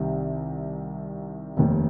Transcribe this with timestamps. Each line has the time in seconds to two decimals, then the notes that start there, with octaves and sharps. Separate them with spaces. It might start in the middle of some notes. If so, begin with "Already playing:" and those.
Already playing: C2 C3 D#3
1.57 F1 D#2 D#3